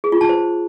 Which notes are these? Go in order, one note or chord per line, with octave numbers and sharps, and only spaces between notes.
G#4
F4
A5
C5